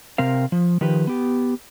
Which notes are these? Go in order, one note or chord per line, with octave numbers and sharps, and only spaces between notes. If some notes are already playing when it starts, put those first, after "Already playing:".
C3 C4 A#4 F5
F3
D#3 F3 G4 B4
B3 G4